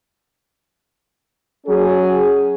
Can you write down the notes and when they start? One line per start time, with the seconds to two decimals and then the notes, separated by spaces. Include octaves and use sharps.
1.66 F#3 C#4 G#4